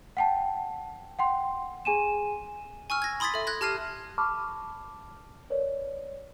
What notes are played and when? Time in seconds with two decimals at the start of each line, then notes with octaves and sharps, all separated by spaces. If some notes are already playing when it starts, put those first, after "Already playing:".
0.17 F#5 G5 A5
1.19 F#5 G5 C6
1.85 G#4 G#5 D#7 E7
2.90 G#5 C#6 E6 F6
3.02 G#6 A#6
3.20 B5 C6 D#6 G#6 A6 B6
3.34 A4 E5
3.47 F#6 G#6 A#6
3.61 G4 A5 F6 G#6 C7 D#7
4.18 A5 B5 C#6 D6 F6
5.50 A#4 B4 C#5 D5